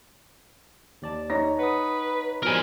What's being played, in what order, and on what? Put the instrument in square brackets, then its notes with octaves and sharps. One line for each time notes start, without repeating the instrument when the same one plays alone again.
[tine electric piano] D#2 D5 A5
[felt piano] D#4 C#5 A#6
[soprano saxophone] B4 [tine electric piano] F#5 D#6
[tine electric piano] B2 F3 G3 [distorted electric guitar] A#4 G#5